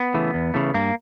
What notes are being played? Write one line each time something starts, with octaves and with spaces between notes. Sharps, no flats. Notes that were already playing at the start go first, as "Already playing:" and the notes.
Already playing: B3
C#3 E3 A3
E2
C#3 E3 A3
G2 A#3